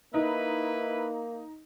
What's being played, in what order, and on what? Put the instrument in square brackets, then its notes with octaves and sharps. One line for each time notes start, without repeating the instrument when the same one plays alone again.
[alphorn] A#3 [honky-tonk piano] D#4 [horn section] E4 B4